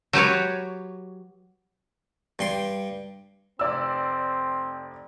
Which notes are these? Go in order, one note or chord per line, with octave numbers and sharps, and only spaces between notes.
F#3 G4 B4 C#5
G2 G5 C6
F1 C4 D5 E6